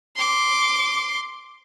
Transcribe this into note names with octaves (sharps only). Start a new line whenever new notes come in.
C6 D6